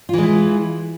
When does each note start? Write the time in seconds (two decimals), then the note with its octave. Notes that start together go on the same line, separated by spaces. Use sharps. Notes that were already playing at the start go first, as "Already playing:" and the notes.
0.09 F4
0.14 E3
0.18 G#3
0.23 E4